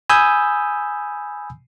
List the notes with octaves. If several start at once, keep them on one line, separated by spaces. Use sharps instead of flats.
G#5 B5 D#6 E6 G6